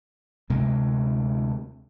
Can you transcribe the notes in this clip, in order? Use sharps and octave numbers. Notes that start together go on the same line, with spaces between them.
D2 C3 G#3